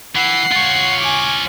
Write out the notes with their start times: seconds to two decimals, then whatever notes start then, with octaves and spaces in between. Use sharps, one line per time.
0.15 E3 F#5 C7
0.52 F4 C#5
1.00 G#5 D6